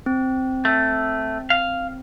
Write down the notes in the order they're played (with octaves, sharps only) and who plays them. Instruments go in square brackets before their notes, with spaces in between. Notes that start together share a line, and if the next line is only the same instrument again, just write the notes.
[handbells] C4
[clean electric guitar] A3
F5